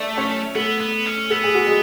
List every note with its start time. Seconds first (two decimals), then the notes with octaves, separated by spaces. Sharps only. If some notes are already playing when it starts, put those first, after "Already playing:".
Already playing: A3 D4 D5 E5
0.17 C#4 C#5
0.55 A3 B3 A4
0.80 B3
1.06 C#4
1.30 B3 A4
1.43 G#4
1.55 F#4
1.66 G#3 G#4